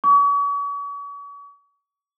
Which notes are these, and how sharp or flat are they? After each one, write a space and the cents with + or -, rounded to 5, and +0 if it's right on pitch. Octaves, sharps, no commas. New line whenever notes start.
C#6 +40